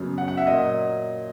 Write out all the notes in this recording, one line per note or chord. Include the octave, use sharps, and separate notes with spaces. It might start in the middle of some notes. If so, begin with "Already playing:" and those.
Already playing: F#2 C#3 F#3 B3
F#5
F#5
E5
A#2 F#3 A#3 D#5